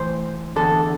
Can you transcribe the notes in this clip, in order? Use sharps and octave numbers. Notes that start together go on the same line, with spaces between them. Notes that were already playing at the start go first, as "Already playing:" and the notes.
Already playing: A2 E3 C5
E2 D3 A4